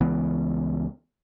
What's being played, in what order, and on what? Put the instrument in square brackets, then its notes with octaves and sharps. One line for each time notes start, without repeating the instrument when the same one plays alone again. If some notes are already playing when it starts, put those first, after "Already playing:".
[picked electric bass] C#2 E3 B3